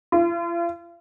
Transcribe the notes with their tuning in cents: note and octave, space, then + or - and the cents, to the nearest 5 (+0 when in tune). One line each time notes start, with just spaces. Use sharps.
F4 -40